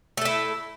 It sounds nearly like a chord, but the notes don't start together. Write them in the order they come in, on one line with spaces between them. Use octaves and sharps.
A3 A4 E4